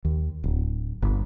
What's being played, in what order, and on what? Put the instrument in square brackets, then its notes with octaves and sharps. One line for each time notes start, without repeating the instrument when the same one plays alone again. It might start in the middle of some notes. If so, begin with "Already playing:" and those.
[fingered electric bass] D#2
D1
G1